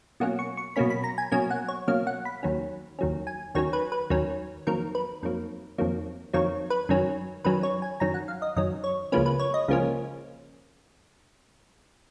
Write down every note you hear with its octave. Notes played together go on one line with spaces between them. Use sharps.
B2 F#3 A#3 C#4 F#5
C#6
C#6
B2 F#3 A#3 C#4 B5
B5
A#5
G#5
B2 F#3 A#3 C#4 G#5
F#5
C#5
B2 F#3 A#3 C#4 F5
F#5
B5
D#2 D#3 F#3 C#4
D#2 D#3 F#3 C#4
G#5
D#2 D#3 F#3 C#4 C#5
B4
B4
D#2 D#3 F#3 C#4
F2 D#3 F#3 A#3 A#4
B4
F2 D#3 F#3 A#3
F2 D#3 F#3 A#3
F2 D#3 F#3 A#3 C#5
B4
F#2 D#3 F#3 C#4
F#2 D#3 F#3 C#4 B4
C#5
G#5
F#2 D#3 F#3 C#4 A#5
F#5
F5
D#5
F#2 D#3 F#3 C#4 D#5
C#5
C#2 C#3 F3 A#3 C#4 B4
B4
C#5
D#5
C#2 C#3 F3 A#3 C#4